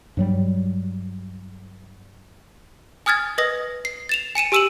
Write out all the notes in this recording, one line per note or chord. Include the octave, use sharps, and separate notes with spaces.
G2 F#3 G3
G#5 D#6 F6 G#6 A6
B4 D#5 D#6 A#6
C7
A6 E7 F7
G#5 C#7 D#7 E7
G4 G#5 E6 D#7 E7 F#7